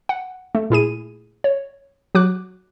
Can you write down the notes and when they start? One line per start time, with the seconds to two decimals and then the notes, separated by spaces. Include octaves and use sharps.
0.09 F#5
0.55 A3
0.70 A#2 E4 G#4 D#7
1.44 C#5
2.15 F#3 F#4 D6 F#6